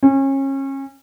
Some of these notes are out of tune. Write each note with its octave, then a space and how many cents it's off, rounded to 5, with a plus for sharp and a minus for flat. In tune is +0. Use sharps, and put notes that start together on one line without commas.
C#4 -30